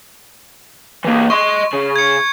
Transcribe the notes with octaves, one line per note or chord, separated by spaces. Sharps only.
E3 A#3
D#5 C6 C#6
C#3
G#6 C#7